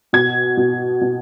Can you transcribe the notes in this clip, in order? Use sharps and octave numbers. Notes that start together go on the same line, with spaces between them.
B2 G#6
B2
B2